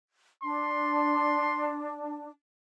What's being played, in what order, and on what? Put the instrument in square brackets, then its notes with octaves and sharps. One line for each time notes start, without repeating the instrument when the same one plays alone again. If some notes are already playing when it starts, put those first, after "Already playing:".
[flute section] D4 [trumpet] C6